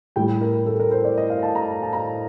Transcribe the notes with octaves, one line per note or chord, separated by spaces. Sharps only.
A2 G3 G5
A#4
A4
A#4
C5
D5
D#5
F5
A5
A#5
A5
A#5